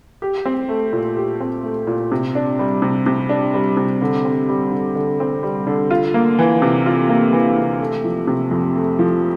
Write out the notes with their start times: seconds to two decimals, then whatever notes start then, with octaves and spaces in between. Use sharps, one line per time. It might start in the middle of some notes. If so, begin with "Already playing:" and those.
0.22 G4
0.45 C4
0.69 A3
0.93 A#2
1.17 G4
1.41 C4
1.64 A3
1.87 A#2
2.12 C3
2.35 D4
2.59 G3
2.82 C3
3.06 C3
3.29 D4
3.54 G3
3.77 C3
4.02 D3
4.25 C4
4.49 G3
4.72 D3
4.96 D3
5.20 C4
5.43 G3
5.67 D3
5.91 F4
6.14 A#3
6.39 E3
6.62 C3
6.86 F4
7.09 A#3
7.33 E3
7.57 C3
7.81 A3
8.04 F3
8.27 C3
8.51 F2
8.75 A3
8.99 F3